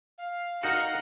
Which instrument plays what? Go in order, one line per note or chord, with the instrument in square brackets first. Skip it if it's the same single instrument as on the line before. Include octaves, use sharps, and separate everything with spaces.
[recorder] F5
[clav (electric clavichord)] D#4 F#4 [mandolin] A#4 [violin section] D#5 F#5 A#5